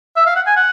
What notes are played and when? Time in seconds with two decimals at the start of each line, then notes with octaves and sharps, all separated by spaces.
0.16 E5
0.26 F5
0.36 F#5
0.47 G#5
0.56 F#5